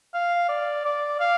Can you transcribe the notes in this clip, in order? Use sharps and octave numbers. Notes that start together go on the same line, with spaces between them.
F5
D5
D5
F5